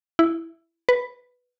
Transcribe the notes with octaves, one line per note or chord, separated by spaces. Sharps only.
E4
B4